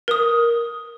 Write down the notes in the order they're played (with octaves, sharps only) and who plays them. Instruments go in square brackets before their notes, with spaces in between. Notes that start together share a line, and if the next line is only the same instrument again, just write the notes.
[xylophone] A#4 D#6